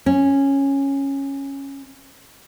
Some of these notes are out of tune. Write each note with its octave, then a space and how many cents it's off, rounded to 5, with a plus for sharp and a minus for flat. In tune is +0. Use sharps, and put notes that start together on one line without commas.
C#4 -10